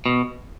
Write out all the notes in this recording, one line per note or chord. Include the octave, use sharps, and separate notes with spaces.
B2